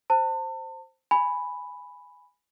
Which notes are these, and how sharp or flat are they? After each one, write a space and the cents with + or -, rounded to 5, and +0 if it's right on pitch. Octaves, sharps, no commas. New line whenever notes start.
C5 +0 A5 +35
G#5 +0 B5 +0